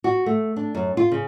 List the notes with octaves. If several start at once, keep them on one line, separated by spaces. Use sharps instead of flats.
F#4
A3
D4
F#2
F4
C#3